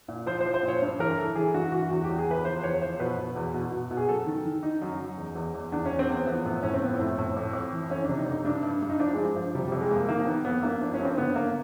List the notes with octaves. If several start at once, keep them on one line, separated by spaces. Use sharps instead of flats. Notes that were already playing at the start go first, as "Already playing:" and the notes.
A#2
F3 C5
C5
F3
C5
A#2
C#5
G2
E3 A#4
E3 A4
E3 G#4
G2 F#4
E3 F#4
E2 F#4
G4
E2
G#4
E2 B4
F3 C5
E2 C#5
F3 C5
B2 B4
B2
E2
B2
B2
B2
G#4
F#2 A4
D#3
D#3
D#3 D#4
F#2
F#2
E2
E2
E2
E2 D4
C#4
E2
C4
E2 B3
F3 B3
A2 B3
A2 C#4
C4
F3 B3
C4
A2
A2
F2
F2
E3
F2 C#4
C3 D4
D#4
F2
D#4
G2 D4
G2
G2
D#4
F3 D4
G2 G#3
F3
C3 G3
F2 G3
G#3
F2 A#3
D#3 A#3
D#3 B3
F2 B3
G2 A#3
F3 D4
C#4
G2
C4
D3 B3
D3 A#3